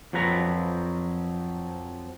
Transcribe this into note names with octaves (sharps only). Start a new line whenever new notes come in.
F2 F3 F#3 B4 A#5